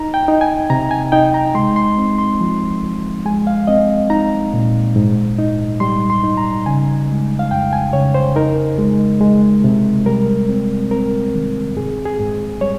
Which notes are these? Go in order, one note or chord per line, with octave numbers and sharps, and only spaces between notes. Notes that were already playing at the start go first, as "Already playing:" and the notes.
Already playing: D#4 A#5
G5
D#4
G#5
C3 A#5
G#5
D#4 G5
A#5
G#3 C6
C6
C4
C6
F3
F3
G#3 G#5
F5
C4 D#5
D#4 A#5
A#2
G#2
D#4
G3 C6
C6
D#4
A#5
C#3 G#5
G#3
F5
F2 G5
G#5
C#3 C#5
C5
D#4 A#4
G#3
G#3
C3
G3 A#4
C4
C4 A#4
D#3
G#2 G#4
G#4
G#2
G3 C#5